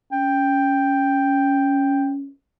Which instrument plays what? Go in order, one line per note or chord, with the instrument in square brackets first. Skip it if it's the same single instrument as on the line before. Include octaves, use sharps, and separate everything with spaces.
[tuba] C#4 [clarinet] G5